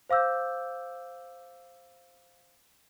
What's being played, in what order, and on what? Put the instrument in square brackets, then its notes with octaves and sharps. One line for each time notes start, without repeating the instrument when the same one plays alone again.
[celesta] C5 F5 D6 E6 G6